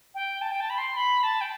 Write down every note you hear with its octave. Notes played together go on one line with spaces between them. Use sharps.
G5
A5
G5
A5
B5
C6
B5
A5
G5